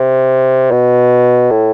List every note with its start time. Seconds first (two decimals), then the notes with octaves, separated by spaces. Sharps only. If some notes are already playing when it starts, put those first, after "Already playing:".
Already playing: C3
0.71 B2
1.51 A2